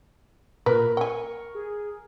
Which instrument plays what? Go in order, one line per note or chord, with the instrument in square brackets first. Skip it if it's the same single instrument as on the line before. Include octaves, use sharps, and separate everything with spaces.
[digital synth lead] A#2 [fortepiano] A#4 [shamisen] B4
[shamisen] G5 G#5 [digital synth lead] C#6
[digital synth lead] G#4